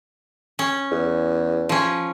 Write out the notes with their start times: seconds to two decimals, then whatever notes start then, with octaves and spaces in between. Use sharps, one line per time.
0.59 C#4
0.91 E2
1.69 F3 C#4